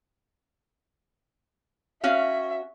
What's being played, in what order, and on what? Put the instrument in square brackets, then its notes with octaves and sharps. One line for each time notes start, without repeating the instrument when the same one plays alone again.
[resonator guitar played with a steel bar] C#4 F#4 F5 [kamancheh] E5